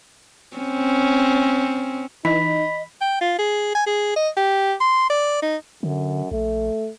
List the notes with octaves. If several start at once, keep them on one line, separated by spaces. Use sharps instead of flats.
C4 C#4
E3 D#4 D#5 B5 B6
G5
F4
G#4
G#5
G#4
D#5
G4
C6
D5
D#4
F#2 D3
A#1 A3